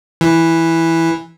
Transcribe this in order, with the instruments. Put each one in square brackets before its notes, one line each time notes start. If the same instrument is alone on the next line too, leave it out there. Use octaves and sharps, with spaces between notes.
[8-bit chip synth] E3